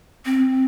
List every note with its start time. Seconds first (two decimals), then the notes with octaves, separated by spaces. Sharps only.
0.26 C4